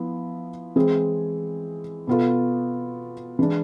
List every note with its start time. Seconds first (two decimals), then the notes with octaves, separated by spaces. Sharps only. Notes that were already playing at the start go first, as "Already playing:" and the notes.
Already playing: F3 B3 E4
0.76 E3 G#3 C4 G#4
2.07 B2 B3 F4 A4
3.39 E3 G#3 D4